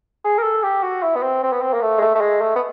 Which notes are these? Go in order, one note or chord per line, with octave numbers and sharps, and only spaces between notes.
G#4
A#4
A4
G4
F#4
E4
B3
C4
C4
B3
C4
A#3
A3
G#3
A3
A3
G#3
A3
B3